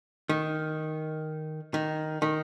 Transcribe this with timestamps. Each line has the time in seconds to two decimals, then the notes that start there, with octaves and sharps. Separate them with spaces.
0.29 D#3
1.74 D#3
2.22 D#3